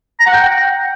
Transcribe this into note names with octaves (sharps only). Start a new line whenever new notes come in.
A#5
F#5
G5